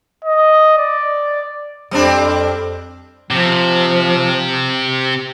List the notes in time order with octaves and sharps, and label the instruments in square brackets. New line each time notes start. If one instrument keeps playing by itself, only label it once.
[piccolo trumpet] D#5
D5
[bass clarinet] F2 [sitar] G3 C4 D4
[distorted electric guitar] C3 [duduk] F3